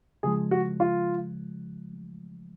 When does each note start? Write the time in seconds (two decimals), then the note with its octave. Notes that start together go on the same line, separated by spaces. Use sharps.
0.23 C#3 F3 G#3 G#4
0.51 F#4
0.80 F4